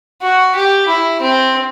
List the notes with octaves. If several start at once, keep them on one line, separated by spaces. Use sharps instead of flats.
F#4
G4
E4
C4